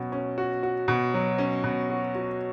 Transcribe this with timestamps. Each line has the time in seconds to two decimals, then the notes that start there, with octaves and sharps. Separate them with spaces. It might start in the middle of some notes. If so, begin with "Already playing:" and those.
Already playing: B2 F#3 C#4
0.12 C#4
0.38 F#4
0.63 F#4
0.88 B2
1.14 F#3
1.38 C#4
1.64 B2
1.90 F#4
2.15 F#4